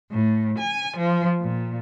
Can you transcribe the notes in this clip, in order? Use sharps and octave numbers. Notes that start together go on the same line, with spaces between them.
A2
G#5
F3
A#2